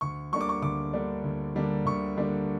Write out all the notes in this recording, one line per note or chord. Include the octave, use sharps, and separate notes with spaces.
D2 C#6
D3 G3 A#3 D4 C#6
D6
C#6
D2 D6
D3 G3 A#3 D4
D2
D3 G3 A#3 D4
D2 C#6
D3 G3 A#3 D4